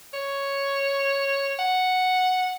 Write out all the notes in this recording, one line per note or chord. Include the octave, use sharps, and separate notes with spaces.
C#5
F#5